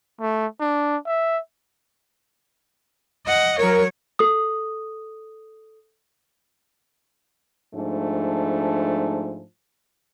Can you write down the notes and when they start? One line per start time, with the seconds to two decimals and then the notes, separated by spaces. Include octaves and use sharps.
0.21 A3
0.60 D4
1.06 E5
3.26 D#5 F#5
3.59 F#3 A#4 C#5
4.19 A4 D#6
7.75 G#2 F3 A3 D4